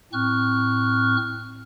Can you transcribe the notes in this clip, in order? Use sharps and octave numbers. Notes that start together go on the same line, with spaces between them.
A2 C4 C#6 F6 F#6